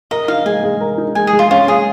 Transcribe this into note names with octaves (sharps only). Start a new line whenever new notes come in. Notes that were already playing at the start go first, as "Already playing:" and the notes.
A#4 D#5
D#4 F5
G#3 G#5
G#3
A#4
D#4
G#3 G#5
G#4
G#3
F4
C#4 F4
G#3 G#4